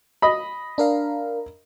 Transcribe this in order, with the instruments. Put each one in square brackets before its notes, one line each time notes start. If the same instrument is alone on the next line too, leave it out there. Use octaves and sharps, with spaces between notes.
[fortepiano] D#5 B5
[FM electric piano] D4 A#4 F5